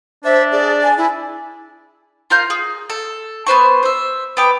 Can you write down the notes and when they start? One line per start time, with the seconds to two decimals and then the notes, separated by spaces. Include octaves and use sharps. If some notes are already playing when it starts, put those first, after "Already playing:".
0.25 D4 C5 E5
0.52 G#4 D5
0.83 G#5
0.97 E4 G#5
2.30 F4 A#4 F5 G6
2.50 G#4
2.90 A4
3.47 B3 B4 C5 C#6
3.83 C5 E5
4.37 B3 G5 D6